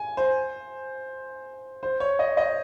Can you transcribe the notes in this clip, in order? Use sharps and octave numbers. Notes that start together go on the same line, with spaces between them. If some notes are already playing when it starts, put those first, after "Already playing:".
Already playing: G#5
C5
C5
C#5
D#5
D#5